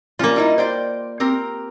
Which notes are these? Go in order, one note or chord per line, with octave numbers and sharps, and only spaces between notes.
G3 A#3 C#4 F4
G3 D#4 E4
C5 D5 G5
C4 G4 A#4